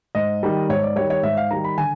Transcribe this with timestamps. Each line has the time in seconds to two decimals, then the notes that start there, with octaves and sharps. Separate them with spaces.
0.15 G#2 D#5
0.43 D#3 G3
0.69 G#2 C#5
0.83 D5
0.96 D#3 G3 C#5
1.10 C#5
1.23 G#2 E5
1.37 F5
1.50 D#3 G3 A#5
1.64 B5
1.78 D3 G#5